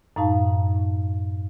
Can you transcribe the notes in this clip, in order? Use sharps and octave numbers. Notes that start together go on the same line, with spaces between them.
F#2 A2 D#4 F5 A5